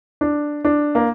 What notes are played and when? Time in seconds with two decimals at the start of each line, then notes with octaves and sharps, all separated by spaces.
0.21 D4
0.65 D4
0.95 A#3